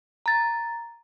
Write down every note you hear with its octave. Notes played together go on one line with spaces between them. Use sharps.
A#5 A6